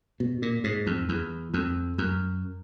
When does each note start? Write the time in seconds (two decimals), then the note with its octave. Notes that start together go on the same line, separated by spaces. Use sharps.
0.20 B2
0.42 A#2
0.64 G#2
0.87 F2
1.09 E2
1.54 F2
1.98 F#2